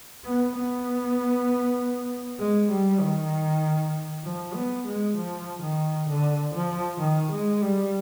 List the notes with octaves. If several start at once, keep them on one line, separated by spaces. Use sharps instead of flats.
B3
B3
G#3
G3
D#3
F3
B3
G#3
F3
D#3
D3
F3
D#3
G#3
G3